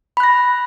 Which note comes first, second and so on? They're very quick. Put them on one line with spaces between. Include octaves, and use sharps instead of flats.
B5 F#6 A#6